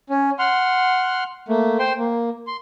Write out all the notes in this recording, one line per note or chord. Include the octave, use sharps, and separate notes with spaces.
C#4
F#5 C6 F6
A3 A#3
C5 G5 C6
A#3
C6